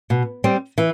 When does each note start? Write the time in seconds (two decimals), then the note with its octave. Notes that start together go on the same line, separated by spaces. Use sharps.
0.10 B2
0.44 G3 C4
0.78 E3